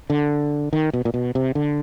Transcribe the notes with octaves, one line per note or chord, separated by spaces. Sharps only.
D3
D#3
B2
A#2
B2
C3
D3